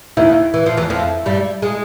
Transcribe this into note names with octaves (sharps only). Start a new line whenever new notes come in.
D#2 D#3 E4
E3
F3
E2 E3
F2 F3
G2 G3
G#3